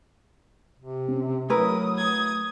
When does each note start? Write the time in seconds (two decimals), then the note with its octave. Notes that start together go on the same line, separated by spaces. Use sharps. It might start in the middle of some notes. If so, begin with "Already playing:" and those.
0.79 C3
1.08 C4 C#4
1.50 F#3 A3 E4 A#4 B4 D#6
1.95 D#6 G#6